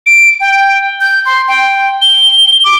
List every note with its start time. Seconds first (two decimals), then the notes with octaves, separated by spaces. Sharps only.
0.06 D7
0.40 G5
1.00 G6
1.26 C6
1.48 G5
2.02 G7
2.64 D6